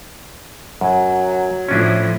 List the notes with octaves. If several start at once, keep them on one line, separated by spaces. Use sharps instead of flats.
F#2 F#3
A2 F3 C#4 D4 E4